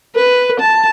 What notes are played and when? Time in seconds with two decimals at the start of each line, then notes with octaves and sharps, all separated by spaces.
0.16 B4
0.60 A5